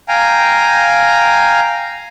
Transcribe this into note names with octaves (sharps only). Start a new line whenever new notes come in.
F5 G5 G#5 A#5